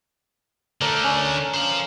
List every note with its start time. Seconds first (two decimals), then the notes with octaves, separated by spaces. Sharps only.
0.81 D3 A3 A4 A#4 D5
1.04 C#4
1.54 C5 F5